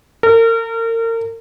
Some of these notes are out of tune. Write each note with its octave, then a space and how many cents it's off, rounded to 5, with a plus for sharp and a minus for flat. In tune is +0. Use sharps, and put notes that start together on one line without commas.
A#4 -35